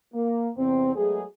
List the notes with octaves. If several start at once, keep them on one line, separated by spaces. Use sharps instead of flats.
A#3
E2 C3 C4
F#3 G#3 A3 B3 G#4